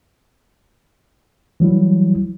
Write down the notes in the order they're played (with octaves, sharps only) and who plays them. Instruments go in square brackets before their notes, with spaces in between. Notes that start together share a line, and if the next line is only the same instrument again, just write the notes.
[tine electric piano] E3 F#3 G3 E4